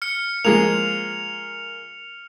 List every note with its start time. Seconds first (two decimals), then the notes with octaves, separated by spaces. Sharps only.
0.02 F6 C#7
0.45 F3 G#3 A#3 F7